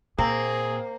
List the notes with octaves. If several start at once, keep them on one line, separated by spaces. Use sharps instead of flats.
A#2 A#3 C4 G#4